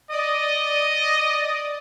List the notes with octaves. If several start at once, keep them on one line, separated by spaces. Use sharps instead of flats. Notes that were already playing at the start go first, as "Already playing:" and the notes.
D5 D#5 D#6